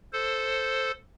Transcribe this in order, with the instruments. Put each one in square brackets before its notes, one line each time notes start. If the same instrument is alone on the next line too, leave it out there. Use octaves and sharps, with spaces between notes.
[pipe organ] A4 C5